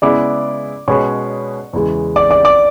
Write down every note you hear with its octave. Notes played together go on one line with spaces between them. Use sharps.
C#3 G#3 B3 E4 G#4 D5 D6
B2 G#3 C#4 G#4 B4 C#5 C#6
E2 C#3 E3 G#3
D5 D6
D5 D6
D5 D6